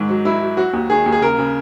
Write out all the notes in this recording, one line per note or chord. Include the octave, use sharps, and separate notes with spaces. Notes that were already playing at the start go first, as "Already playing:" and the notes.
Already playing: G#2 D#3
F#3
F#3 E4
F#3
F#3 F#4
D#2
D#3 G#4
D#2
G#4
C#3 A#4
C#3